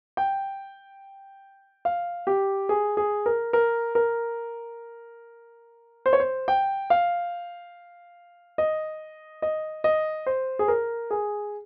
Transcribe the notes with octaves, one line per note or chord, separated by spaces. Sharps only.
G5
F5
G4
G#4
G#4
A#4
A#4
A#4
C5
C#5
C5
G5
F5
D#5
D#5
D#5
C5
G#4
A#4
G#4